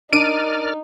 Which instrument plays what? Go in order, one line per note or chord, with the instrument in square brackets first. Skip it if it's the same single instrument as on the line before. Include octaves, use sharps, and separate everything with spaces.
[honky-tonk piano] D4 [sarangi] D#4 [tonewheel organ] A#4 D5 F6 [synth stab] D7 D#7